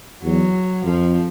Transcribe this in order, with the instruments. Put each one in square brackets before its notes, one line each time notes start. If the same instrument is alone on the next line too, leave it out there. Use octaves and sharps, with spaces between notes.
[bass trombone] E2 [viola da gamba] F#3
[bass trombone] F2 [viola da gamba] F3